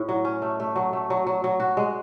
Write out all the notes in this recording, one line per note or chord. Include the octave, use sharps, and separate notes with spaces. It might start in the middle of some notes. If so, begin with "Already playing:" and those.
Already playing: A2
F#3
C#4
A3
A3
F#3
A3
F#3
F#3
F#3
F#4
G#3